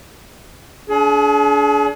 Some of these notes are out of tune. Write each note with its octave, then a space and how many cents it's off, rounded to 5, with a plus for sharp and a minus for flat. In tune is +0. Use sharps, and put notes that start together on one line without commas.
D4 -35 G#4 +35